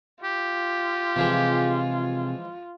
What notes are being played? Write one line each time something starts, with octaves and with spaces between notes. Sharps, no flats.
F4 G4
C3 E3 F3 G#3 G#4